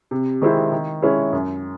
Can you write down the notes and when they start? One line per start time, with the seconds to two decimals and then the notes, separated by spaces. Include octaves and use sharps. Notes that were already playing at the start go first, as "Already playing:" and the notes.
0.11 C3
0.42 D#3 G#3 C4 E4
0.72 D#3
1.02 G#3 C#4 E4
1.33 F#2